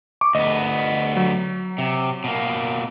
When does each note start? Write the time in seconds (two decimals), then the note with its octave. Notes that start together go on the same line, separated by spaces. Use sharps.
0.21 C#6 D6
0.35 D2 B3 D#5
1.16 F#3
1.78 C3
2.24 B2 A#3